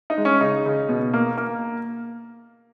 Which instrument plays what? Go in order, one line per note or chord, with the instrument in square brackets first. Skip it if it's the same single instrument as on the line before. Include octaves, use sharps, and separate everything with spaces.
[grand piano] D#4
G#3
C#4
C#3 D#4
C#3
B2
A#3
A#3